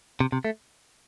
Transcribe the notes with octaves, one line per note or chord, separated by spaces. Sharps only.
C3
C3
A3